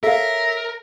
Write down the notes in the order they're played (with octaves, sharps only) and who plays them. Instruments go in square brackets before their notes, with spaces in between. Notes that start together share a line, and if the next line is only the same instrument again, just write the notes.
[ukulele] A4 C#5 F5 [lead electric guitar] A#4 [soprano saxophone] E5